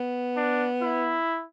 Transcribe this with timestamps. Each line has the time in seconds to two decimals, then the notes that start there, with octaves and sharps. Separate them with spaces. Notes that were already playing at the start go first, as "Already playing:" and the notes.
Already playing: B3
0.37 D4
0.81 E4